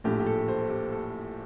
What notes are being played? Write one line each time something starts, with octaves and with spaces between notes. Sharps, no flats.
A#1 A2 A3 D4 G4
G4
A4
C5
G4
A4